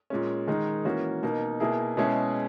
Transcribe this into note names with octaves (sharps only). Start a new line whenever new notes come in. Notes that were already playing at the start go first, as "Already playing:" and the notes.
A#2 G#3 C#4
D#3 G#3 D#4 A#4
E3 A#3 C#4 F#4
B2 A#3 D#4
B2 A#3 E4 G#4
B2 G#3 C#4 E4 G#4